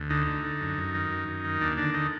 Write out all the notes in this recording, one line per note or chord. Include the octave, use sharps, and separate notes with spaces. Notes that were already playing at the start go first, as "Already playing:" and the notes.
Already playing: D2
D3 D#4
D3
D3
F#2
F#2
D#3
F#2
F#2
D#3
D#2 D4
D3 D4
D3 D#4